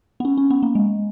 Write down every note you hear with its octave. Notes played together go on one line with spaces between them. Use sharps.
B3
C#4
C#4
B3
A#3
G#3